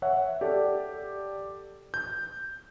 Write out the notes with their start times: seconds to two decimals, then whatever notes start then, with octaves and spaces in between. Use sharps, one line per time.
0.02 C#5 E5 F#5
0.41 G4 A4 D5
1.94 G6